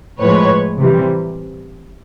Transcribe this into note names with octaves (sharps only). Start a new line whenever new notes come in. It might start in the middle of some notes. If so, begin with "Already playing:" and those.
A2 F3 G#3 B4 C#5
C3 E3 G3